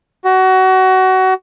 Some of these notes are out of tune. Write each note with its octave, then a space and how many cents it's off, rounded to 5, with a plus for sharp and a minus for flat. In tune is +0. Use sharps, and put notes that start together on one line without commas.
F#4 +25